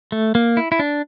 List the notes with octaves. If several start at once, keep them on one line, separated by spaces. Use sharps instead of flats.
A3
A#3
E4
E4
D4